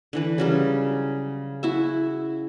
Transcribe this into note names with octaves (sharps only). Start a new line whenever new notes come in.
D3 E3 B4
C#3 F#3 G3
E4 F#4 E5